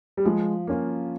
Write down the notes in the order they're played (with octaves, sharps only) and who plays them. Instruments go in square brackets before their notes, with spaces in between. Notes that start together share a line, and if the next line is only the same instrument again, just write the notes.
[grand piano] G3
[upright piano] F3 [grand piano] G#3
[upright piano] A#3 C#4 F4